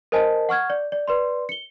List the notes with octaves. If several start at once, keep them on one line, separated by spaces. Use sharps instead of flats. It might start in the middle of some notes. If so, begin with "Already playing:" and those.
A#4 C5 D#5 G#5 A5
F#5 C#6 F6 G#6
D5
D5
B4 D5 C6
C#7 G7